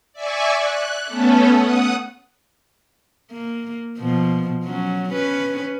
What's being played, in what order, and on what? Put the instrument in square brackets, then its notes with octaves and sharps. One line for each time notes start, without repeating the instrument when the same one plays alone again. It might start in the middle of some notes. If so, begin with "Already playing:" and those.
[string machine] D5 E5 G#5 C#6
F#6
A3 B3 C#4 A4
F#5 D#6
[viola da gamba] A#3
B2 F3
F#3 C#4
C#4 B4